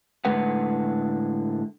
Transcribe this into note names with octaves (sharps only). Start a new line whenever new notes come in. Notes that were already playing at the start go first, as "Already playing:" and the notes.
A2 D3 G#3 B4 F#5